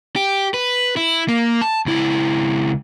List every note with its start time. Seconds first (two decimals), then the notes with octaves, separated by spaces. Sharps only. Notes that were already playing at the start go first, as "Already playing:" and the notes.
0.16 G4
0.54 B4
0.97 E4
1.29 A#3
1.62 A5
1.86 C#2 E4